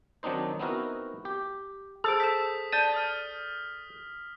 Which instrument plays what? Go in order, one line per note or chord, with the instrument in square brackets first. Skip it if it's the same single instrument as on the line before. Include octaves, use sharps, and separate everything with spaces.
[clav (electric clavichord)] D#3 F#3 C4 D4 D#4 C5
B3 C4 D#4 E4 F#4 A#4
G4
[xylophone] G#4 C5 D7 [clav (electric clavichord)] A4 [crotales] D#6
[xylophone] C5 E7 [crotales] B6
[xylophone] D5 A5 [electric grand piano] G6 A6 D#7
[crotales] D#6 F6